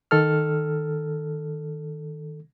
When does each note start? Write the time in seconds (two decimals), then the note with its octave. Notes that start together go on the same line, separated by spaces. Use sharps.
0.11 D#3 A4 F6